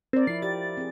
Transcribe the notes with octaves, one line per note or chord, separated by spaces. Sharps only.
C4 A#4 D5
F3 E4 C7
G4 D5 A6
C4 G#4